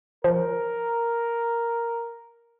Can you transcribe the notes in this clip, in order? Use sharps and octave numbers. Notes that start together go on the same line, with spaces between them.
F3 A#4